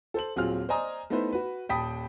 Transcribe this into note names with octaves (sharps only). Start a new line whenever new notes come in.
A4 C5 F#7
D#1 F#3 C4 F4 G#4 F6
C5 D5 D#5 G#5 A#5 D#6
A3 B3 D#4 E4 B4 C5
F#4 B4
D#1 G5 A5 B5 D#6 B6